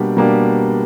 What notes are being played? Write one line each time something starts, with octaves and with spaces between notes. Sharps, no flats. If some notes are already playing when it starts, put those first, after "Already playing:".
Already playing: B2 G3 A#3 D4 G4
B2 G3 A#3 D4 G4